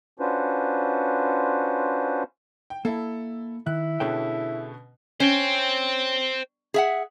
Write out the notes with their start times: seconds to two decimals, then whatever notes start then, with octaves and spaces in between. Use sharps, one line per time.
0.20 C#4 D4 F4 F#4 B4 C5
2.70 G5
2.85 A#3 E4 A4
3.67 D#3 E4 F#6
4.00 B2 D3 C#4 G#4 A4 G5
5.20 C#4 C5 G5
6.74 G#4 E5 F#5